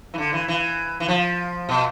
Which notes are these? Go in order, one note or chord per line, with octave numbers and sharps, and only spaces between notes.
E3
D3
E3
E3
E3
F3
B2